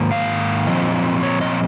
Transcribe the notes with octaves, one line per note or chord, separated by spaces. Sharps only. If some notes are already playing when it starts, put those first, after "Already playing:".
Already playing: G#2 D#3 A#3
F5
A#2 F3 C4 D#5
C#5
D#5